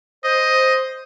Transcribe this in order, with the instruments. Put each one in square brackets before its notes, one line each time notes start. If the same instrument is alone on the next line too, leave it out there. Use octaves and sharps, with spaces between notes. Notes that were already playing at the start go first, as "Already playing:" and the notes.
[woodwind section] C5 [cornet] D#5